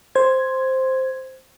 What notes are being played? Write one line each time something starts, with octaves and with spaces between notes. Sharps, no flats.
C5 G#6